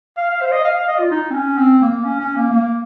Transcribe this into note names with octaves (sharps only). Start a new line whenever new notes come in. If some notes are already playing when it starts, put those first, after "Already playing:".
F5
F5
C5
D#5
F5
F5
D#5
F4
D#4
C4
C#4
C4
A#3
C#4
C#4
A#3
A#3